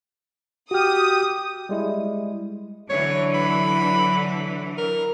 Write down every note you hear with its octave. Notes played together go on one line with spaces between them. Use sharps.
F#4 G4 D#6 F6
G3 G#3 E4
D3 E3 F#3 C#5
B5
A#4